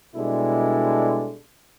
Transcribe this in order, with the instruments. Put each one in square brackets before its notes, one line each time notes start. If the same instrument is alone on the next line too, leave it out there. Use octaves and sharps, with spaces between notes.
[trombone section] B2 G3 G#3 D4 E4 A4